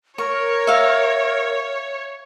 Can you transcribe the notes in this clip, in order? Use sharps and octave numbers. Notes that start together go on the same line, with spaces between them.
A#4 C#5 C#6
E5 F5